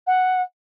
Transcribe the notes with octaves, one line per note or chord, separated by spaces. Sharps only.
F#5